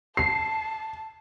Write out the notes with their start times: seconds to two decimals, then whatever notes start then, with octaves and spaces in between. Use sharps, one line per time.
0.17 A5 C7